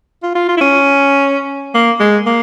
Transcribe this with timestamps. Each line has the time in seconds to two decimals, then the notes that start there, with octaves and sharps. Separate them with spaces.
0.23 F4
0.35 F4
0.48 F4
0.57 E4
0.61 C#4
1.74 A#3
2.00 G#3
2.26 A#3